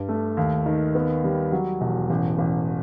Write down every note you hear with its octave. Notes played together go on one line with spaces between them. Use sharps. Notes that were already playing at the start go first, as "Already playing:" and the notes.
Already playing: G2
A3
D#2
D#3
B3
G3
F#3
E1
A1
A1